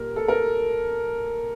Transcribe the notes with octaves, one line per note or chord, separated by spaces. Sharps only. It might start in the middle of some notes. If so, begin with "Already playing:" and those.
Already playing: A#2 G3 A#4
A4
A#4